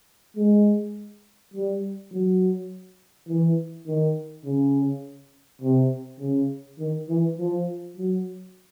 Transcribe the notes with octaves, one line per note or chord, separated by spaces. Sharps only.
G#3
G3
F#3
E3
D#3
C#3
C3
C#3
D#3
E3
F3
F#3